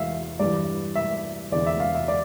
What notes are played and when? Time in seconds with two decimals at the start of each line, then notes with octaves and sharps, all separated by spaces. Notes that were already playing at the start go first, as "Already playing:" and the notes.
Already playing: E2 E3 E5 F5
0.39 G2 E3 D5
0.95 E5
1.52 E2 D3 D5
1.66 E5
1.80 F5
1.95 E5
2.08 D5